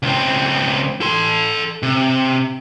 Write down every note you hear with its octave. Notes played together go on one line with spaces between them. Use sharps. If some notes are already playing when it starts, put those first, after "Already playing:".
C#2 C4
A4 C6
C3